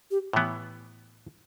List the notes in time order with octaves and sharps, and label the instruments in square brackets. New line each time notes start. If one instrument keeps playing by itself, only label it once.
[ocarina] G4
[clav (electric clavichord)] A2 E3 B3